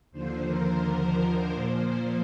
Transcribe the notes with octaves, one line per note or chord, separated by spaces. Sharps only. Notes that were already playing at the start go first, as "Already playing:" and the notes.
D#2 D3 F3 C5
A#4
C5
A#2 F3 A#3